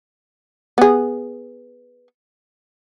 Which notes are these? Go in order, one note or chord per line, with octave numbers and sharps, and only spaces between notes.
B3 G#4